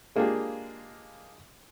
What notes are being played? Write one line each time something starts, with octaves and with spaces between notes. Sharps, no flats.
G#3 A#3 D4 F4 G4 G#4